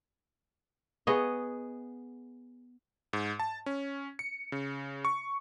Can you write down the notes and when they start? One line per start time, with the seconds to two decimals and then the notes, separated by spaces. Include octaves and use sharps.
1.07 B3 G#4 C#5 D#5
3.13 G#2
3.40 A5
3.66 C#4
4.19 C#7
4.52 C#3
5.05 C#6